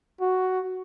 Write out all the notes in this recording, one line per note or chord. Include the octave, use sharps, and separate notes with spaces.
F#4